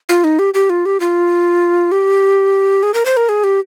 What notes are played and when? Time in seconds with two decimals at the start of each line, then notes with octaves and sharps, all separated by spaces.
0.09 F4
0.24 D#4
0.39 G4
0.54 G4
0.70 F4
0.86 G4
1.00 F4
1.92 G4
2.83 G#4
2.94 A#4
3.06 C5
3.17 A#4
3.29 G#4
3.44 G4